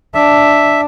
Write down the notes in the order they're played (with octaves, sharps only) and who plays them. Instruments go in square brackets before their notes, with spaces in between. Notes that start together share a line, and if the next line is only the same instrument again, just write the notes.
[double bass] D4 [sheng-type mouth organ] E5